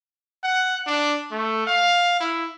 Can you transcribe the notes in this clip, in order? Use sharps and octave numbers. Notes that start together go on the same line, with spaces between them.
F#5
D4
A3
F5
E4